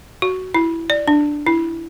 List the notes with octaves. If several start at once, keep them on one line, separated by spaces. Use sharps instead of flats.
F#4
E4
D5
D4
E4